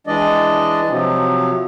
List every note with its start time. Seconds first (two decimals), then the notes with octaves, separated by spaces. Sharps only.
0.07 E3 G#3 D4 D5 D#5
0.89 C3 F3 F#3